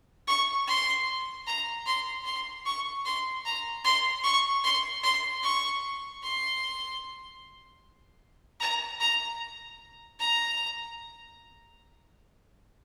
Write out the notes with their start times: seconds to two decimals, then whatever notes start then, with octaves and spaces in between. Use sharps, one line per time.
0.27 C#6
0.67 C6
1.46 A#5
1.86 C6
2.25 C6
2.65 C#6
3.05 C6
3.45 A#5
3.84 C6
4.23 C#6
4.64 C6
5.03 C6
5.43 C#6
6.23 C6
8.60 A#5
9.00 A#5
10.19 A#5